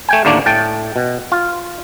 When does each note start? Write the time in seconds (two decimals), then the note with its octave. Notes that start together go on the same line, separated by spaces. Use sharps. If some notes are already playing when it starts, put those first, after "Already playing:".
0.09 A3 G5 G#5
0.25 D#2 A2 D3 A#3 D4
0.46 A2 G5 A5
0.96 B2
1.32 F4